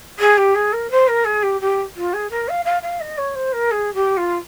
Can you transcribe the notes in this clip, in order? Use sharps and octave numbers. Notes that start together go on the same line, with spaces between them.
G#4
G4
G#4
A#4
C5
A#4
G#4
G4
G4
F4
G#4
A#4
F5
F5
F5
D#5
C#5
C5
A#4
G#4
G4
F4